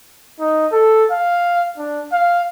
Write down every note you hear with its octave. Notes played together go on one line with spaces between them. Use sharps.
D#4
A4
F5
D4
F5